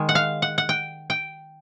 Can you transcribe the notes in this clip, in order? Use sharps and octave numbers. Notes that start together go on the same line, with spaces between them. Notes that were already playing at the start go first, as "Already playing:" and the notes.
Already playing: D#3 G#3
F#5
F5
F#5
F#5
G5
G5